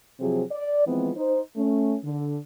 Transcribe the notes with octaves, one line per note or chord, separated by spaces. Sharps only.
C3 F3 F#3 C4 G#4
D5
E3 F3 G#3 B3 C4
D#4 C5
A3 C#4
D3